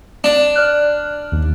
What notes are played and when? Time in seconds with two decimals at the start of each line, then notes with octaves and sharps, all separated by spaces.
0.24 D4
0.56 D5 F6 F#6
1.32 D#2